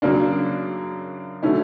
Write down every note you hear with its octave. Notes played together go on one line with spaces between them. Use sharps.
F#2 C#3 F#3 A#3 D4
D3 F#3 A3 C#4 E4